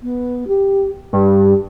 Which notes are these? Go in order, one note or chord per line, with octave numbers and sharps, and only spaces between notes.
B3
G4
G2 G4